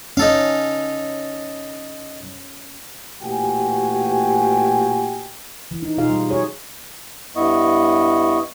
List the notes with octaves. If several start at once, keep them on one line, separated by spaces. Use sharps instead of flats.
C#4 D#4 A4 F5
A1 A#2 F#4 G4 G5 G#5
E3
D#4
B2 D#4 F4 G#4 F5
G3
F#4 G#4 C#5
G2 B3 E4 D#5 C#6